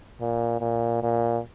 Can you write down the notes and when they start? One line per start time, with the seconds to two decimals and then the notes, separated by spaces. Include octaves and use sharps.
0.21 A#2
0.61 A#2
1.03 A#2